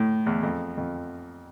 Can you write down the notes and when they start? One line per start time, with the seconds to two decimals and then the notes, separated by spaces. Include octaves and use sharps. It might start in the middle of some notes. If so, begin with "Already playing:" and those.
Already playing: A2
0.26 E2
0.43 F2
0.77 F2